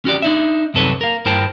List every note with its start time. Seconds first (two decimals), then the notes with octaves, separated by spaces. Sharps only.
0.05 C#4 F#4 G4 D5
0.22 D4 D#4 E5
0.74 C2 F#2 C3 A4 B4 C#5
1.01 A#4 F5
1.26 G2 E4 A#4 C5 G5 A5